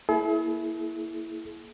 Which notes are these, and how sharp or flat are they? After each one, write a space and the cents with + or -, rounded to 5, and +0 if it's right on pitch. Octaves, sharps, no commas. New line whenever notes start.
A#3 +0 E4 +0 G#4 +45